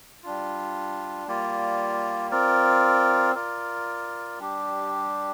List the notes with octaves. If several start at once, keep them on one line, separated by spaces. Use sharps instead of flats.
G3 D4 F4
G3 A#3 F4 D5
C4 F4 A#4 D5
F4 A#4 D5
G3 D4 G4